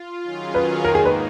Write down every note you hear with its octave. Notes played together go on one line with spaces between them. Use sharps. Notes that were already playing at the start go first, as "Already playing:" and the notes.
Already playing: F4
D#3 F#3 C#4 F4 G#4
B4
G#2 D#3 A#3 A#4
G#4
B4